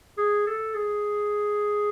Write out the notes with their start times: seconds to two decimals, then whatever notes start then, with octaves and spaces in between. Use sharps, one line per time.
0.18 G#4
0.47 A4
0.74 G#4